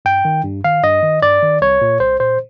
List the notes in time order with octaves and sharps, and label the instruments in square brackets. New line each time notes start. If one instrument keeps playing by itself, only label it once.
[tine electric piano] G2 G5
D#3
G2
D#3 F5
G2 D#5
D#3
G2 D5
D#3
C2 C#5
A#2
C2 C5
A#2 C5